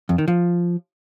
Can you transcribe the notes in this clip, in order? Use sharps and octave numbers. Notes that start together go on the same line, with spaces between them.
F2
D#3
F3